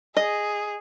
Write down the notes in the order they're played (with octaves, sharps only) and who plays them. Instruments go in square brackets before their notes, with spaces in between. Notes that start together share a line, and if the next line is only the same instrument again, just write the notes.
[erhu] G#4 [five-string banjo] D#5